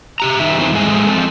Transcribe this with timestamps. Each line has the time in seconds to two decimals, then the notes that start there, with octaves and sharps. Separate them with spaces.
0.20 C3 G4 A#5
0.40 F#2 D#3 D#4 E5
0.57 E2 E3 C4
0.73 A2 G#3 A3 G#5
1.07 F3 C4 A4